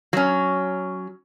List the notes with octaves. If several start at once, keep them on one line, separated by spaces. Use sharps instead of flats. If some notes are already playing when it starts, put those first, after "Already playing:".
F#3 C#4